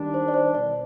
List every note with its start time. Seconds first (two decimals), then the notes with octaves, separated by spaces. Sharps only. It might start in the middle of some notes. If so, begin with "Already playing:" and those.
Already playing: D#3 G3 D4
0.14 C5
0.28 D5
0.34 C5
0.54 B2 D5